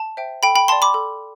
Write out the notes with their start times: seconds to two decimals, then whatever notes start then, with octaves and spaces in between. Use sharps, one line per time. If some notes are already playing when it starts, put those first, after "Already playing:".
Already playing: A5
0.17 C5 E5 G5
0.43 A4 G5 B5
0.56 G5 B5
0.68 D5 F5 A5 C6
0.82 B5 D6
0.94 A4